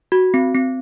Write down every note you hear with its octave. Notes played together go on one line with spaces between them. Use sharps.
F#4
C4
C4